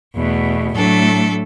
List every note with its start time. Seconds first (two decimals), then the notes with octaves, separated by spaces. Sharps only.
0.14 E2 B2 A3
0.72 A2 F#3 A3 D4 A4